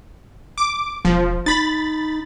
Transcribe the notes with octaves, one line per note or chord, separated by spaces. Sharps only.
D6
E1 F3
D#4 B5 A6